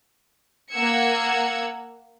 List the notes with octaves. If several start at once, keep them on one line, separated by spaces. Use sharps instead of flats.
A#3 F#5 E6 G#6 C#7